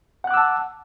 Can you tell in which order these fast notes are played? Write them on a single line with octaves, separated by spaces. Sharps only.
F#5 F#6 D6 E6 A5